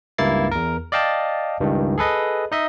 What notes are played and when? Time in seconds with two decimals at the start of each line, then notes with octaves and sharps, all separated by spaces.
0.18 C#2 G2 A#3 E4 A6 C7
0.51 E2 A#4
0.92 D5 D#5 F5 G5 A5
1.60 C#2 G2 D#3
1.98 G#4 A4 B4 D#5
2.52 D#4 D#5 E5